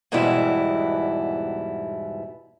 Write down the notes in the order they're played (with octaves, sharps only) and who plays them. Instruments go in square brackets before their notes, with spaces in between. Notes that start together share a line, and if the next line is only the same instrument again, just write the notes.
[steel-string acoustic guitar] E2 G#2 B2 E3 G3 E4